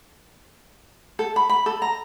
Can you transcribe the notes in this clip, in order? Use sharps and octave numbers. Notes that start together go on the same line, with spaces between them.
A4
B5
B5
A4
A#5